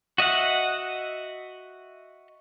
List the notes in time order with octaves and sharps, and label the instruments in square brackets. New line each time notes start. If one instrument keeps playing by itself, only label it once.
[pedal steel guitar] F#4 D#5 E5 F#5